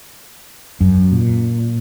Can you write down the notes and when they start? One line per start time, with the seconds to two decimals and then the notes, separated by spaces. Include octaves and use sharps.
0.81 F#2
1.12 A#2